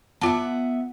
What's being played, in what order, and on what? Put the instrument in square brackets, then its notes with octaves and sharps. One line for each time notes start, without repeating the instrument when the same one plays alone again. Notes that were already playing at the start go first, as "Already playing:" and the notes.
[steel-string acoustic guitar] B3 E5 F#5 [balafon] F4 A5